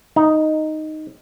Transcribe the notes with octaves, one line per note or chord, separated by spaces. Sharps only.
D#4